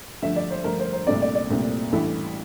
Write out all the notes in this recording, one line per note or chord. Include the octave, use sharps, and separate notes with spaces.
G2 D3 F3 A3 E5
D5
C5
G2 D3 F3 A3 A#4
C5
C5
C2 A#2 A3 C4 D5
D5
D5
C2 A#2 A3 C4
A1 G2 E3 A3 E4